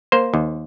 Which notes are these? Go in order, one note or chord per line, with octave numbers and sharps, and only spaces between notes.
A#3 C5
D#2